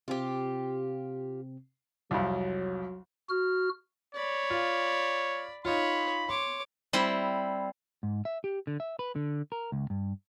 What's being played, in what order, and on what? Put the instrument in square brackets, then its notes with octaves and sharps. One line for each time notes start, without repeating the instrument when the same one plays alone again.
[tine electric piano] C3 C4 [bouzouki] F4 G4
[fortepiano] C2 F2 [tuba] F#3
[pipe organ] F#4 F6
[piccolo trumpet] C#5 [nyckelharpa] D5 B5
[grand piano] F4
[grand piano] D#4 F4 [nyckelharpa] C#5 [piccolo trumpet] B5
[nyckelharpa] C#5 D6 [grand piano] C6
[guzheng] G3 C4 E4
[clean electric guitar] G#2
E5
G4
D3
E5
B4
D3
A#4
C#2
G2